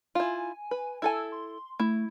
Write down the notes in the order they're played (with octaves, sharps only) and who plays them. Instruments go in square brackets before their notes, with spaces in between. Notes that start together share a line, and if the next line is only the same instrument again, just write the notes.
[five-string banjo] E4 F4 [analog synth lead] G#5
[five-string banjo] B4
[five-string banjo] E4 A4 G#5 [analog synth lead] E6
[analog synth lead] C6
[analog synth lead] A3 [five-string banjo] E4